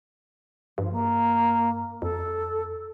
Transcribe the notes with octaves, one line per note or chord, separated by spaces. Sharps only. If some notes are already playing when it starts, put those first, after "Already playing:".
G2 F3
A#3
F2 A4